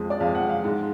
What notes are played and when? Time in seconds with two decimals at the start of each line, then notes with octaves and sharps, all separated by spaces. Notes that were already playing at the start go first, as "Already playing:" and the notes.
Already playing: F2 F3 G#3
0.10 D5
0.20 F2 F3 G#3 F5
0.35 F#5
0.49 F5
0.64 G#2 G#3